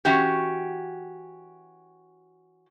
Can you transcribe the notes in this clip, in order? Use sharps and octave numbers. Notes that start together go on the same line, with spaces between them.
E3 C#4 F#4 G4